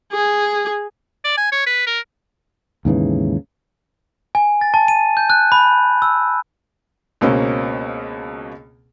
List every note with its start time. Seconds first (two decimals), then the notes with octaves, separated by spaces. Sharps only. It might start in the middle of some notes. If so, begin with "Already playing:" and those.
0.12 G#4
1.25 D5
1.37 G#5
1.52 C#5
1.66 B4
1.87 A#4
2.85 D#2 G#2 C#3 E3
4.35 G#5
4.61 A6
4.74 A5
4.88 D#7
5.17 G6
5.30 F#6
5.52 B5
6.02 E6
7.21 C#2 B2 A#3 C4 C#4